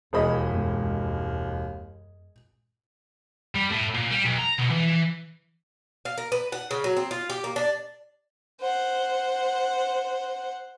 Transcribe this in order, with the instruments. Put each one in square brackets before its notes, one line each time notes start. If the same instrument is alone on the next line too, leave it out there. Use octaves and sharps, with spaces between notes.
[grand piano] E1 C5 B5 [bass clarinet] D#2 [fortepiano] G#4 A#4 D#5
[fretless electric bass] F#2 G#3 B3
[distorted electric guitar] G3
A2
A#2
G3
B1
A#5
B2
E3
[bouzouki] F5
A#4
B4
F#5
C#3
F#3
C4
F4
G4
A#3
D4
[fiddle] C5 F#5